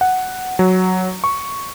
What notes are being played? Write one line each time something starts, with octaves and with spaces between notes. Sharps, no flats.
F#5
F#3
C#6